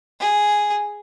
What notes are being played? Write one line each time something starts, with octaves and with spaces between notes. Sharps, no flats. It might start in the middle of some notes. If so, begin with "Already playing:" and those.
G#4